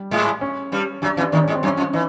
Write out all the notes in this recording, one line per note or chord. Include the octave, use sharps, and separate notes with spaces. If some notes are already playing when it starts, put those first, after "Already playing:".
Already playing: G3
G#2 G#3
C#4
G2 G3
F#2 F#3 D4
E2 E3 D4
D#2 D#3 D4
G#2 G#3 C#4
C4
F#2 F#3
C#4
F2 F3
E3 D#4